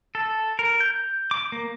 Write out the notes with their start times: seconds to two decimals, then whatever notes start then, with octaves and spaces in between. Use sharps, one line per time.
0.15 A4
0.59 A#4
0.80 G6
1.31 D6
1.52 A#3